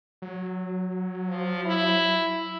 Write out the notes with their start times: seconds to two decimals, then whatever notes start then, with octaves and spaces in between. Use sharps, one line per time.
0.22 F#3
1.29 F3
1.65 E4